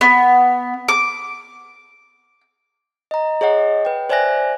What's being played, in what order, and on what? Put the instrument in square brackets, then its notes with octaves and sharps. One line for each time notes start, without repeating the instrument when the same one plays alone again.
[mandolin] B3
D6
[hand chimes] D#5 A#5
G#4 C#5 D#5 F#5
B4 G5
C5 D5 E5 G#5 F#6 A#6